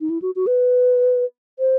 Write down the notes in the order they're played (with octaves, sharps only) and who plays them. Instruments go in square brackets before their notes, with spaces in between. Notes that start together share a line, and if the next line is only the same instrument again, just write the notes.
[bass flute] D#4
E4
F#4
F#4
B4
C5